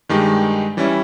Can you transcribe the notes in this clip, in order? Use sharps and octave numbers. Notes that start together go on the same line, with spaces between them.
G2 D#3 G#3 D#4 G4
E3 G3 C#4 E4